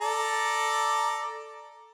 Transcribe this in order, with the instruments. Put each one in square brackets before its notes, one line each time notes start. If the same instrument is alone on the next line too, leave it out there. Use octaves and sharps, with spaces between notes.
[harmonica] A4 D5 A#5